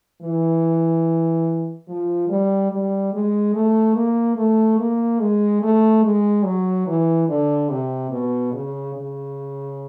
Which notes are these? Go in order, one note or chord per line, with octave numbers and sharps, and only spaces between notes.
E3
F3
G3
G3
G#3
A3
A#3
A3
A#3
G#3
A3
G#3
F#3
E3
D3
C3
B2
C#3
C#3